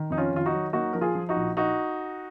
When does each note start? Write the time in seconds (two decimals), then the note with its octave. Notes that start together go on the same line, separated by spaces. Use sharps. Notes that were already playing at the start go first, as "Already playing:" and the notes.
Already playing: D#3
0.10 F2 D#4
0.17 C#4 F4
0.32 D#3 F4
0.46 D#4 F#4
0.53 F#3
0.73 A#3 D#4 F#4
0.93 F3 A#4
1.01 F4 G#4
1.15 F3
1.29 D#4 F#4
1.36 A#1
1.57 D#4 F#4